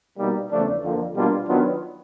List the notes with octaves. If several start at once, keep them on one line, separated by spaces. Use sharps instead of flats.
B2 G3 A#3 D#4
E2 C#3 F3 A3 D4
F2 D3 F3 A#3
B2 G3 A#3 D4 F4
D#3 F#3 B3 D4 F4